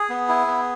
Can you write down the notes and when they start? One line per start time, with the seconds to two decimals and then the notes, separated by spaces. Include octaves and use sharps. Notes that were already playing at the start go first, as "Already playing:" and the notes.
Already playing: G#4
0.10 B3
0.28 E4
0.47 B3